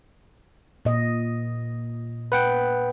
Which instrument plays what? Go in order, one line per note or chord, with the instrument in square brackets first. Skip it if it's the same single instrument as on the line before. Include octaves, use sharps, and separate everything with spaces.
[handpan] A#2 D#5
[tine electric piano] B4 F#5 G5